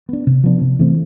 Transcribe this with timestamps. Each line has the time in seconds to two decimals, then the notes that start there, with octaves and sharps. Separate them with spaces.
0.09 B3 D4
0.27 C3
0.44 F3 B3 D4
0.61 C3
0.79 E3 A3 C4